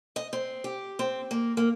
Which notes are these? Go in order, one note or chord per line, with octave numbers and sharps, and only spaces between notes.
D#5
C4
G4
C4
A#3
A#3